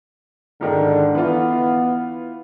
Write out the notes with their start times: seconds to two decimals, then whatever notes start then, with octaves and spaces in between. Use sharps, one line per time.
0.61 G#2 D3 D#3
1.15 E3 B3 F4